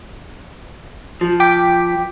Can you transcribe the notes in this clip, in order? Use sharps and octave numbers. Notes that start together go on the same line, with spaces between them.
F3
G5 D6 B6